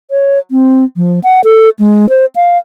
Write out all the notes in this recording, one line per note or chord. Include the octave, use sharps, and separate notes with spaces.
C#5
C4
F3
F#5
A4
G#3
C5
F5